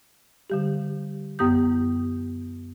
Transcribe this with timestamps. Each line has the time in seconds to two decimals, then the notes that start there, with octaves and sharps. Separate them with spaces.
0.50 D3 G3 G4
1.39 F#2 B3 G4 D#6 G6